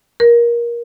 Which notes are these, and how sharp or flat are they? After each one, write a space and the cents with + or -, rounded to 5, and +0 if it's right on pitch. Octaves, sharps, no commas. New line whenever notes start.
A#4 +20